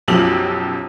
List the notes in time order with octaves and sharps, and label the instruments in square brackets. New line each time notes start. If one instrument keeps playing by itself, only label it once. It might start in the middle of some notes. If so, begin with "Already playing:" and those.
[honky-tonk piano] B1 F#2 F3 G4 E6 F#7